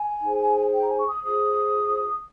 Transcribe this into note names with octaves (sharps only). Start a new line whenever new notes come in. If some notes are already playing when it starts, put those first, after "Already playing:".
Already playing: G#5
D#4 G#4 C5
G5
A#5
G#5
C#6
D#6
F4 G#4 C5 D#6